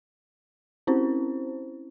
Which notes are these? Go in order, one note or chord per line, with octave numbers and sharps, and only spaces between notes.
C4 C#4 E4 C5